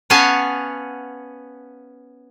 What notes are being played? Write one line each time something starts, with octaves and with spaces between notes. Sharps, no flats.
B3 C#4 F5 F#5 G#5 A5